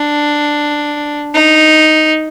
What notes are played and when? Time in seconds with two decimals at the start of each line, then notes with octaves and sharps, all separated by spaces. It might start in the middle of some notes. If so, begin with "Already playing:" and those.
Already playing: D4
1.34 D#4